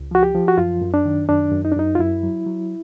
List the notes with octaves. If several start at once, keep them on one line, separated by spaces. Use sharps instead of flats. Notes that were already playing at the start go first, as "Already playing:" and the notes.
Already playing: C#2
F3 F#4
G4
F3
F#4
F#2 F4
F#2
D4
D#3
F#2 D4
F#2
D#4
D4
F#2 D#4
F4
F#2 E4
F#3
F#3